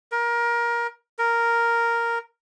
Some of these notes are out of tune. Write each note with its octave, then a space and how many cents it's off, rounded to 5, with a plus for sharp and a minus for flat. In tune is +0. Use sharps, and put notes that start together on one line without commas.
A#4 +20
A#4 +0